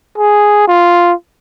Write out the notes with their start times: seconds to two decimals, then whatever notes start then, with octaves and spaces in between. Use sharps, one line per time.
0.18 G#4
0.68 F4